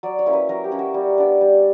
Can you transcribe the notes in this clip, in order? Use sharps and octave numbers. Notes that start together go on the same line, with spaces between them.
F#3 D5
C#5
A#3 C#4 E4
B4
F#3 A#4
G4
A#3 C#4 E4
F#4
G3
B3 D4
G3